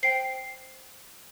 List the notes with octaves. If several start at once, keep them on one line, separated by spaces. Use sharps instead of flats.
C5 G5 C7